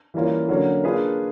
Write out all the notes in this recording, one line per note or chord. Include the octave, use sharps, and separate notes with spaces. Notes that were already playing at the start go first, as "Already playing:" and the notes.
E3 G3 A#3 C#4 F4
D3 F#3 A#3 C#4 F#4
A#3 D4 F4 G#4 B4